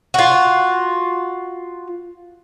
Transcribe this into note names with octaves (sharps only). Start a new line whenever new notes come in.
F4 F#4